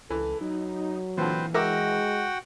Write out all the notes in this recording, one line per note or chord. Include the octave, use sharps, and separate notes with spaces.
C#2 E3 A4
F#3 D#4
A#2 D3 E3 C4 B4 C5
G#3 F#4 A#4 E5 F#5 G5 D6